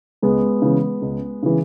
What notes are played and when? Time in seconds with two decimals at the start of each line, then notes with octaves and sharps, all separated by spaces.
0.22 C#2 G#3 B3
0.62 C#3 E3
1.02 C#2
1.43 C#3 E3